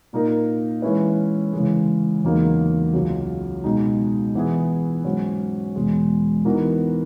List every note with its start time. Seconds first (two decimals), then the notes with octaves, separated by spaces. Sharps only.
0.13 A#2 A#3 D#4 A#4
0.82 E3 G#3 C#4 E4 B4
1.53 C#3 E3 G#3
2.24 E2 C#3 F#3 A#3 D#4
2.93 C#2 C#3 F#3
3.64 B2 G#3 D#4
4.35 E3 B3 E4 G#4
5.04 G#2 F#3 C#4 F#4
5.76 E2 B2 G#3
6.45 E3 B3 D#4 F#4 A#4